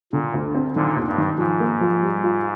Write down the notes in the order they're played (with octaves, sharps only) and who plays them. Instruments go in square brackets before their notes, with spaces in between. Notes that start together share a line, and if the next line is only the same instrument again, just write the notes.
[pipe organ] A#2 [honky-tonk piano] D3
[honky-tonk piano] D2
C4
[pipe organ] A#2 D3 [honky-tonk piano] D#3
[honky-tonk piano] D#2
[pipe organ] G2
[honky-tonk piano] D#3
[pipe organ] G#2 [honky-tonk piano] F3
[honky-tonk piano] A#3
F3
G3
F4